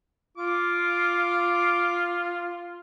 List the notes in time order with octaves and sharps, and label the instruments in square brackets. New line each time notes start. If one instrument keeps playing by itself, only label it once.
[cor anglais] F4 [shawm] D6